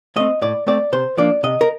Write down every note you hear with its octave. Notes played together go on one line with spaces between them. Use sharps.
A3 C4 D#5
A2 D5
A3 C4 D5
C3 C5
F3 A#3 D4 D5
C3 D#5
A#4